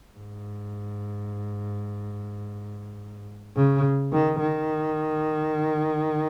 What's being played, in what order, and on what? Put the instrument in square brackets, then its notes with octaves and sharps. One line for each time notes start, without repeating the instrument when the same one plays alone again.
[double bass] G#2
C#3
D#3
D#3